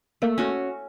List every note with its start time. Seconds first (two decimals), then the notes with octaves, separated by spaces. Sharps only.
0.22 A3 A#3
0.38 C#4 F#4